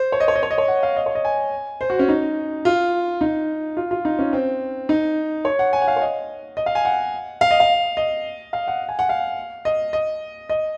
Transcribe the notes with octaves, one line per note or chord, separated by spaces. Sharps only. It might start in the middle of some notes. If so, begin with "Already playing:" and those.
Already playing: C5
C#5
D#5
C#5
D#5
C#5
D#5
C#5
F#5
F5
D#5
C#5
D#5
G#5
C5
F#4
C#4
D#4
F4
D#4
F4
F4
D#4
C#4
C4
D#4
C#5
F#5
G#5
F#5
F5
C#5
D#5
D#5
F5
G#5
F#5
F5
D#5
F5
D#5
F5
F#5
G#5
F#5
F5
D#5
D#5
D#5